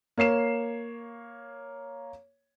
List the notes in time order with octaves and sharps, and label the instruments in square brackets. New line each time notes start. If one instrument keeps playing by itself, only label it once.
[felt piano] A#3 C#5 C7 E7